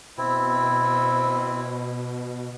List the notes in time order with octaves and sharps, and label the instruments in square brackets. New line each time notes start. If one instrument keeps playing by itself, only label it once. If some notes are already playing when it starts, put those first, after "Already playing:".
[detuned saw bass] B2 [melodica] C4 E4